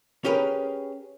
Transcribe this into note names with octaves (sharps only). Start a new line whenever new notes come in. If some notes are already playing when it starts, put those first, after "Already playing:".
C#4 G4 G#4 A#4 B4